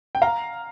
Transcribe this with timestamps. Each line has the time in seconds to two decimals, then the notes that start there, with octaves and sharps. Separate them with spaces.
0.15 G5
0.22 F5 A#5